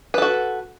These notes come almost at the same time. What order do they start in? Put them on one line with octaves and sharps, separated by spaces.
B4 A4 F#4